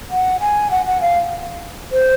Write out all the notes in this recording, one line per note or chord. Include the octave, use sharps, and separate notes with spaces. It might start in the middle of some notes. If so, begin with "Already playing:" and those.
F#5
G#5
F#5
F#5
F5
C5